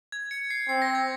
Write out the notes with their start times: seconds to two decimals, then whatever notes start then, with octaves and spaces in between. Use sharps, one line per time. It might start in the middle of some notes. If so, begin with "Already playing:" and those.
0.12 G#6
0.31 C#7
0.50 C7
0.69 C4 C7
0.82 A#6
0.95 G#6